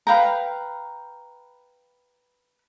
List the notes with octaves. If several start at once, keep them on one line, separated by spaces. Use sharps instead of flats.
B4 F5 G5 A#5